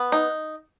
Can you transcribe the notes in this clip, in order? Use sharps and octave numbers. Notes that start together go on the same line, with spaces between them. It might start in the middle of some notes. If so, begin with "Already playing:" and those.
Already playing: B3
D#4